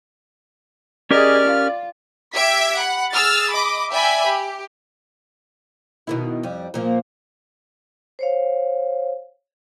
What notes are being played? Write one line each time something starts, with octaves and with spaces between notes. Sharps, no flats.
C#4 G4 G#4 A#4 D5 D#5 F6
F4
G4 E5 E6 G#6 B6 D7
F#5 B5
G#4 E6 F6 A6
D#5 B5 D6
D5 E5 G5 G#5 B5
G4
B2 D#3 E4
F2 G3
A#2 F3 A#3
C5 C#5 F5